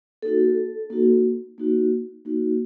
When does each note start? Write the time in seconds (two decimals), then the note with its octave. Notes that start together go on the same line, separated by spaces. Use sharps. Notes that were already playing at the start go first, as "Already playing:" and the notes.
0.22 A#3 D#4 F#4 A4
0.90 A#3 D#4 F#4
1.58 A#3 D#4 F#4
2.25 A#3 D#4 F#4